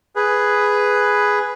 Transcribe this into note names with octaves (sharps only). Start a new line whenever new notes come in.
G#4 B4